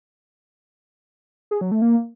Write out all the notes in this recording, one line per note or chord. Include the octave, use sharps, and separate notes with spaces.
G#4
F#3
A3
A#3